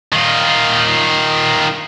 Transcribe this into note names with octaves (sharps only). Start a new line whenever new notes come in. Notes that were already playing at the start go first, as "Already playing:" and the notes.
D#3 F4